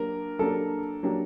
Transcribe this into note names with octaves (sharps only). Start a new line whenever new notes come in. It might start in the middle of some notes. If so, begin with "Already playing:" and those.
Already playing: F#3 A#3 D4 G4 A#4
F#3 A#3 D4 G4 A4
F#3 A#3 D4 G4